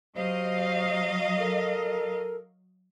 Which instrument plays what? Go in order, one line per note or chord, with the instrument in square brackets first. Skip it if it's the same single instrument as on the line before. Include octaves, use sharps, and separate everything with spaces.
[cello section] F#3 D#5 F5 [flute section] G4 C5
[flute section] A4 A#4